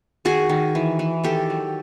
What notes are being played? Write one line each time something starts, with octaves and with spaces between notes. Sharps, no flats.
D#3 F#4 G#4
D#3
E3
E3
D#3 G4 A4
F#3